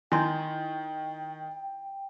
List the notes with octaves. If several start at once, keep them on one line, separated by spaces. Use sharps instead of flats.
D#3 E4 D#5 G5 G#5 C6 G6